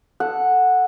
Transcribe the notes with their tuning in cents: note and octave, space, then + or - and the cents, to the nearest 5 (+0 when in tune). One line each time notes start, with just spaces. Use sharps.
A4 +0 F#5 -10